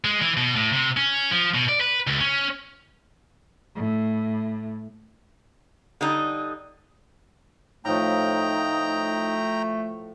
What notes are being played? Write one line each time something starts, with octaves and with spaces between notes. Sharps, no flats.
G#3
E3
B2
A2
C3
C#4
F3
B2
D5
B4
C#2
C#4
A2
D3 G3 D#4 D#6
A2 F3 A3 D#4 G5 A#5